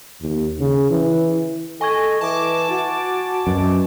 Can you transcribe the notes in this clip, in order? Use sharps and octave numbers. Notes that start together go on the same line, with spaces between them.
D#2
C#3
E3
A4 D#5 G#5 C#6 G#6
E3 A5 D6
F#4
F#2 B2